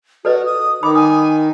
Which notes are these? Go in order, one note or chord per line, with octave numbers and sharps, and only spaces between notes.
F#4 A4 B4 D#5
D#6
D#3 D#4 B5 D6
G#5 D#6